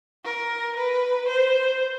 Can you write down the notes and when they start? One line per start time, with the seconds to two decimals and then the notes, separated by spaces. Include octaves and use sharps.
0.25 A#4
0.76 B4
1.28 C5